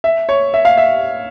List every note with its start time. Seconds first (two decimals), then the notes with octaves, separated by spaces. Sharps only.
0.04 E5
0.29 C#5
0.54 E5
0.65 F5
0.78 E5